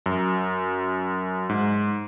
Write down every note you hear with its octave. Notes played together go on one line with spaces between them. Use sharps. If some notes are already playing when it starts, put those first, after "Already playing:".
F#2
G#2